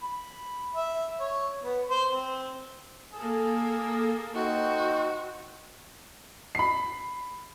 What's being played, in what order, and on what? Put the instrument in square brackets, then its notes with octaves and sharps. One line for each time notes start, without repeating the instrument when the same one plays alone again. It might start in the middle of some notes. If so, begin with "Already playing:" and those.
[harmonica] B5
E5
C#5
B3
C5
C4
[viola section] A#3 A4 [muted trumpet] G#4
[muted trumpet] C4 [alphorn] D#4 [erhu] F#4
[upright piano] B5 C7